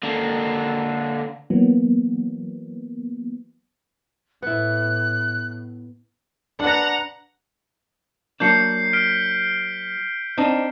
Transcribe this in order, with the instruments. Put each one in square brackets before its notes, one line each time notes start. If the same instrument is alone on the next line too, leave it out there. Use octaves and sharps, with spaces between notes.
[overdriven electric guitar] D3 A#3
[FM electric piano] E3 F#3 A#3 B3
[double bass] A2 [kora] B3 E4 [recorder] F#6
[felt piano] D4 B4 [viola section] F#5 A#5
[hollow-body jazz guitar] F#3 A#3 D4 [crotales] G6 C7 C#7
[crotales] F6 B6 D7
[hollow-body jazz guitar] C4 D4 D#4